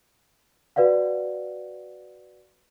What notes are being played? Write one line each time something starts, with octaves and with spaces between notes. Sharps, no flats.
F#4 B4 D5 F5 F#5